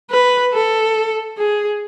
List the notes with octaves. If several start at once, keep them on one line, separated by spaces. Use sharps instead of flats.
B4
A4
G#4